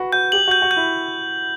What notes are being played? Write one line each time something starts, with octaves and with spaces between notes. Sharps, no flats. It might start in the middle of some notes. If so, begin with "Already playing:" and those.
Already playing: F#4 B4
F#4 G6
G4 F#7
F#4
G6
F#4
G6
E4